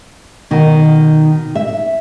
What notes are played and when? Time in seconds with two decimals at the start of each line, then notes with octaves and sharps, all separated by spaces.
0.51 B2 D#3
1.55 E5